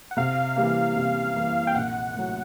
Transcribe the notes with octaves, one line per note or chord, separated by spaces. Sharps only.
F#5
C3 F5
E3 G3 A#3
C3
E3 G3 A#3
G5
A#1 F#5
A2 F#3 F#5